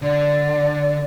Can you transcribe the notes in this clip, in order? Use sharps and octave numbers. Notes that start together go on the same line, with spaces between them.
D3 D5